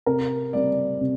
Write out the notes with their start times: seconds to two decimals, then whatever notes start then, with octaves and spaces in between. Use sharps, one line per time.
0.06 C3 A#4
0.53 G3 C4 D5
1.01 C3